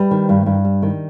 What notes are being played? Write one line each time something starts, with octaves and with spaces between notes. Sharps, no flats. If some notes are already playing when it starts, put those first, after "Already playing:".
Already playing: G3 B4
D#3
G2
G2
G3
D#3